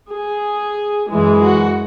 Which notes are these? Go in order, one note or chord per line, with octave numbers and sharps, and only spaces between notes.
G#4
F#2 E3 G#3
F#4